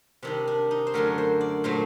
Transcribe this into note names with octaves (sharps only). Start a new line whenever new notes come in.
C3 D#3 G3 D4
D4
D#4
C5
F#2 D3 A3 A#4
C5
D5
A#2 F#3 A3 C5